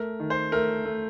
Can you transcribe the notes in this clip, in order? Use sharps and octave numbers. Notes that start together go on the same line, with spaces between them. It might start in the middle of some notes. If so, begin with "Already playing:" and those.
Already playing: A3 A#4
D#3
C5
A3 A#4
A3